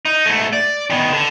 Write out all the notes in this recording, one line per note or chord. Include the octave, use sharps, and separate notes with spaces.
D#4
G#2 A3
D5
D#3 B3
D3